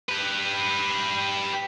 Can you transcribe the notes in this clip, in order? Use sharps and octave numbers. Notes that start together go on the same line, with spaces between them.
G4 B4